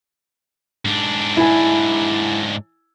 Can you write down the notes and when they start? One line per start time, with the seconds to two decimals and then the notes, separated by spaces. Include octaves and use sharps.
0.85 G#2 D4
1.37 E4 G#5